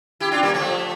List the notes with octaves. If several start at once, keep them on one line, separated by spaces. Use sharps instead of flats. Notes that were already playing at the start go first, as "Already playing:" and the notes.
E4 G4
D4 F4
G3 A#3
F3 A3